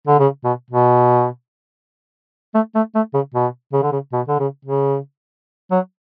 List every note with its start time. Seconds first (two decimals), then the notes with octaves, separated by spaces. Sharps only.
0.07 D3
0.19 C#3
0.44 B2
0.71 B2
2.55 A3
2.75 A3
2.95 A3
3.14 C#3
3.35 B2
3.73 C#3
3.83 D3
3.92 C#3
4.13 B2
4.28 D3
4.39 C#3
4.65 C#3
5.71 F#3